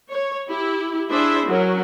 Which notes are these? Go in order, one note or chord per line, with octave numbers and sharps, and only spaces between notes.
C#5
E4 G4
D4 E4 G#4 C5 E5
F#3 C#4 A#4